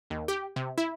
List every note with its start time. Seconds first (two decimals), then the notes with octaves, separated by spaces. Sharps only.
0.10 D#2
0.28 G4
0.56 C3
0.78 E4